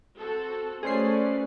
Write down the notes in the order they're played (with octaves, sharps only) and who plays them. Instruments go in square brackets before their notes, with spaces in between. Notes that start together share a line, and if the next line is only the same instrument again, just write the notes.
[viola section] C4 F#4 A4
[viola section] A3 F#4 B4 [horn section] C#4 [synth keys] G#4 C5 C7 [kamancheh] D5